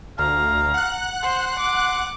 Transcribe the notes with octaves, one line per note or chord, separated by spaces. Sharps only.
D2 F5 A#5
F#5 F#6
C5 C6
D6